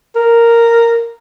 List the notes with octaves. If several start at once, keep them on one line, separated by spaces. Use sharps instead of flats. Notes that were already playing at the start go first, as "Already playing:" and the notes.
A#4